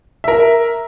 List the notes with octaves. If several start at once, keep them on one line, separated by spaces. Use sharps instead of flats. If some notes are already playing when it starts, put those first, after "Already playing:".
A#4 E5